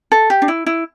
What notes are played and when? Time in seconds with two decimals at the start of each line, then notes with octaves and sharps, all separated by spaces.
0.12 A4
0.30 G4
0.42 D4
0.48 E4
0.66 E4